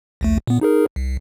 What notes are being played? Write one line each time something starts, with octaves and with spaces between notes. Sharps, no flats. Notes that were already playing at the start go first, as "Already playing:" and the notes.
A#1 D#2 A3
A#2 B3
D#4 G#4 A#4
C2